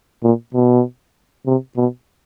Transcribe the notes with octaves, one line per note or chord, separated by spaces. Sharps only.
A#2
B2
C3
B2